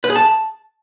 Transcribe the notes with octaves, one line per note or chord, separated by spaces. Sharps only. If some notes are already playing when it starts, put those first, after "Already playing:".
B4
G#4
A5